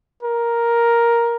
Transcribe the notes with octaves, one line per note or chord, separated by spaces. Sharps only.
A#4